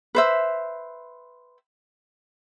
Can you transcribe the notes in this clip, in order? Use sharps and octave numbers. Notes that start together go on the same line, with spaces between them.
B4 C5 E5